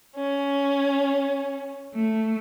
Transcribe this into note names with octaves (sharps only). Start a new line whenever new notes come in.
C#4
A3